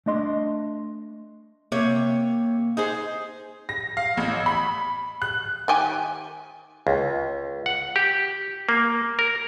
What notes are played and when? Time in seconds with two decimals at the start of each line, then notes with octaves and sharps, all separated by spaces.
0.06 A3 D4 D#5 C6
1.72 C3 A#3 C#5
2.77 D#4 G#4 C5
3.69 A#6
3.97 F5
4.17 A1
4.46 B5
5.22 F#6
5.68 D#3 G4 G#5
6.87 C#2
7.66 F#5
7.96 G4
8.69 A#3
9.19 A#4